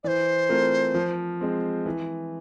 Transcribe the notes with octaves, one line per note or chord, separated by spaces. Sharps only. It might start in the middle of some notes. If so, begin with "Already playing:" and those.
E3 C5 D5
A3 C4 F4 A#4
F3
G#3 C4
E3